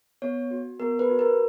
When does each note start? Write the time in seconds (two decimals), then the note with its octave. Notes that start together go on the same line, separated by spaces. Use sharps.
0.22 B3 C#5
0.51 F#4
0.80 B3 A#4
0.99 B4
1.09 F#4
1.19 A#4